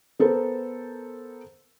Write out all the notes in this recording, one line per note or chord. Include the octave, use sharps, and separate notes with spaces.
B3 A4 A#4 C5